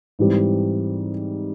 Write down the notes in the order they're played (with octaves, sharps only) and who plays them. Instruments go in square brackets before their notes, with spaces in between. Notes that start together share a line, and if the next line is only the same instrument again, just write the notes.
[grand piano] G#2 E3 G3 C4